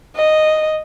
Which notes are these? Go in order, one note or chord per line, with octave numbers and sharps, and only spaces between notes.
D#5